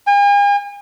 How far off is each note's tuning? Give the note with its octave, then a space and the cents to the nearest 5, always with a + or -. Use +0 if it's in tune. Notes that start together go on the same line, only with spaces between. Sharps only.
G#5 -45